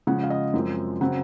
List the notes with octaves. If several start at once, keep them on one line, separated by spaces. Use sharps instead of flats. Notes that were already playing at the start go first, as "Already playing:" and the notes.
C#3 F3 G#3 F#5
F5
D#5
F#2 F3 G#3 C4
C#3 F#3 C4 F#5